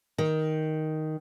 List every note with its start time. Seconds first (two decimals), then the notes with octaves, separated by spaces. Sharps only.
0.18 D#3